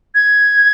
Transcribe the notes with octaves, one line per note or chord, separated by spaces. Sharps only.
G#6